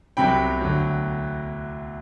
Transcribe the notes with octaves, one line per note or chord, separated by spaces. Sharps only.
C2 C3 F#3 G5 B5
D2 D3 F#3